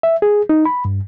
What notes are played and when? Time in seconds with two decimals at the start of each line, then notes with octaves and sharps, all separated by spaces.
0.03 E5
0.22 G#4
0.49 D#4
0.65 B5
0.85 G2